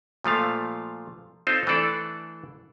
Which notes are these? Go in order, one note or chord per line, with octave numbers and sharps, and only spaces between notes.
A#2 F3 A3 F5
C4 D#4 F4 A4 C5
E3 A3 D4 A4 D5